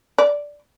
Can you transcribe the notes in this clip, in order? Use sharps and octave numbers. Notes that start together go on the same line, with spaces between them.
D5